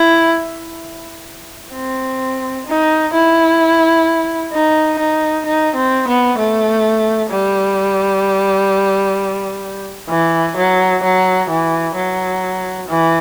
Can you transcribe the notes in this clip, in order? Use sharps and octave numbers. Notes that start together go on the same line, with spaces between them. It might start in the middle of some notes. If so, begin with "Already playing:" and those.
Already playing: E4
C4
D#4
E4
D#4
D#4
D#4
C4
B3
A3
G3
E3
F#3
F#3
E3
F#3
E3